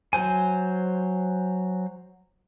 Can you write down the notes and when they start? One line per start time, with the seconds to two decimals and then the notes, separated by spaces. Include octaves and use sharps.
0.13 F#3 C5 G#5